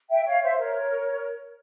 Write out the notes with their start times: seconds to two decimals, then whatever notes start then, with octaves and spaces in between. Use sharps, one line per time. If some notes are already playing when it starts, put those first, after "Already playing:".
0.10 E5 G5
0.25 C#5 F5
0.42 C5 E5
0.58 A#4 C#5